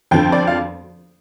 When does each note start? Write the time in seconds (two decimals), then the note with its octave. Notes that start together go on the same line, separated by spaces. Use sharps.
0.11 F2 D3 F3 G5
0.32 D5
0.47 F5